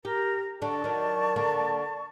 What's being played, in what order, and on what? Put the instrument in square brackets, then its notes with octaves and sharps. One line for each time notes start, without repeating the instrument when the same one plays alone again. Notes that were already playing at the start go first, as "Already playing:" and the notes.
[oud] G4 [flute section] A#4
[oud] D3 D4 [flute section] D5 A5 C#6
[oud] D#3 F#3
D3 A#3